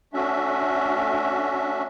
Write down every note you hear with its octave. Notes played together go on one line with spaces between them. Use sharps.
A3 C#4 D4 F#4 E5